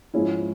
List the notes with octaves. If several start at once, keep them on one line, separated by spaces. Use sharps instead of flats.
G#2 F3 G#3 C#4 E4